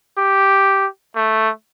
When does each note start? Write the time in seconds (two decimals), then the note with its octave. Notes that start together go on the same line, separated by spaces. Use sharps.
0.18 G4
1.16 A3